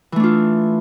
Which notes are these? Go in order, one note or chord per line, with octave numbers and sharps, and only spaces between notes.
E3 A3 D4 F4